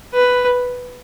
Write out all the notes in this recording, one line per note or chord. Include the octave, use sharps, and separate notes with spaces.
B4